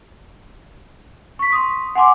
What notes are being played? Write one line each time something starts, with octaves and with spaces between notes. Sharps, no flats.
C#6 B6
C6 D#6
F#5 G#5 C6 D6